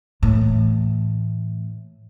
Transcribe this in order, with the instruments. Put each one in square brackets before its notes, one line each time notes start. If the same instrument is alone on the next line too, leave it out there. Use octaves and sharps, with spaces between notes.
[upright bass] A2 E3